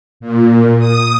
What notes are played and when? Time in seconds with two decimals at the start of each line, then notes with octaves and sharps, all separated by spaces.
0.20 A#2
0.79 D#6